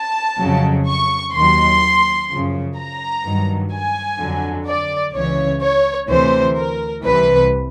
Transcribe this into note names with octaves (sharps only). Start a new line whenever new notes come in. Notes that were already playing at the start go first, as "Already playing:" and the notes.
Already playing: A5
F2 C#3 F#3
C#6
D#2 D#3 F#3 C6
F#2 C#3 F3
A#5
G2 D#3 F#3
G#5
F2 D3 F#3
D5
C#2 C#3 E3 C#5
C#5
D2 C3 E3 C5
A#4
C2 C3 E3 B4